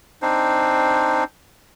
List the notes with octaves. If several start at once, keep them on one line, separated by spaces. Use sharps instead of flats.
C4 D4 D#4 C5